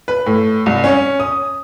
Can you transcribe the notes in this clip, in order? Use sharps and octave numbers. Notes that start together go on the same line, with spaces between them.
B4
A2
C2
C#4
D#6